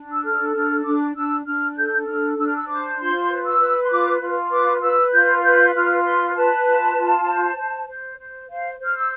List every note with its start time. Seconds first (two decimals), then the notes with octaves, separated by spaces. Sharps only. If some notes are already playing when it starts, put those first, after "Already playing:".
Already playing: D4
0.12 E6
0.23 A4 F6
0.54 D4 F6
0.84 D4 D6
1.15 D4 E6
1.45 D4 F6
1.76 A4 G6
2.06 D4 F6
2.37 D4 E6
2.46 F6
2.55 E6
2.68 C5 D6
2.98 F4 C6
3.29 B4
3.45 E6
3.60 B4
3.82 C6
3.90 F4 D6
4.21 F4
4.51 B4 D6
4.81 B4 E6
5.12 F4 G6
5.43 B4 G6
5.74 F4 F6
6.04 B4 C6
6.35 B4 A5
6.65 F4
6.96 F4
7.26 C5
7.57 C5
7.87 C5
8.18 C5
8.49 C5 F5
8.79 C5 F6
8.97 E6